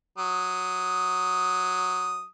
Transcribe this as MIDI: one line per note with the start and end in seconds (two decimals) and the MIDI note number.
0.18 2.26 54
0.18 2.26 87